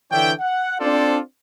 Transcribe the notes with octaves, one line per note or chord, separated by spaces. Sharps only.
D3 E3 D4 C#5 E5 G5
F#5
C4 D4 F4 A4 C5 D5